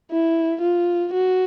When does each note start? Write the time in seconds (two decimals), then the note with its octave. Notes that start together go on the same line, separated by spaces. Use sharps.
0.11 E4
0.61 F4
1.14 F#4